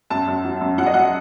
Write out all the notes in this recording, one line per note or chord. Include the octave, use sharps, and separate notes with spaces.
F#2 A5
F#2
F#3
F#2
F#3 F#5
D#5
F#3 F#5